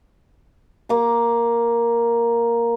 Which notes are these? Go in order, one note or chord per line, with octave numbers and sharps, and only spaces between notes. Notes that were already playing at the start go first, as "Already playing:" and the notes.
A#3 D6